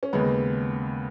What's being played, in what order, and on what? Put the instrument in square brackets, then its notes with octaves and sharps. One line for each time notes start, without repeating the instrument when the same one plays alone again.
[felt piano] C#4
D#2 C#3 G#3 B3